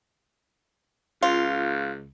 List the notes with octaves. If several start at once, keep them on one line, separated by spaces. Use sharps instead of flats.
C#2 F4